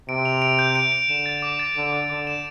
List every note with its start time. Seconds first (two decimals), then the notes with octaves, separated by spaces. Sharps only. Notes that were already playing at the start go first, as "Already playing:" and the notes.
0.09 C3 D7
0.25 F7
0.42 D7
0.59 G6
0.75 D7
0.92 D7
1.09 D3 E7
1.26 A6
1.42 D6
1.59 A6
1.76 D3 E7
1.93 D6
2.10 D3 D6
2.27 E7